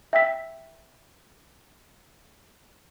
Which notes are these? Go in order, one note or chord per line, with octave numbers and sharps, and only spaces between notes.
E5 G5 E6 B6